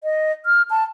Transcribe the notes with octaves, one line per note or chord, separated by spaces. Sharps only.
D#5
F6
A5